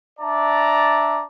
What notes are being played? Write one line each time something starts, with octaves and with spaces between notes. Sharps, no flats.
D4 D5 E5 A5 A#5